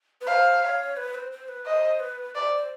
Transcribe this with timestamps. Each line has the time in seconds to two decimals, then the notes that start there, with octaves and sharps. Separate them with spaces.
0.21 B4
0.27 C5 F5
0.62 C#5
0.97 B4
1.14 C5
1.32 C5
1.48 B4
1.65 C5 D#5
2.00 B4
2.35 C5 D5
2.52 C5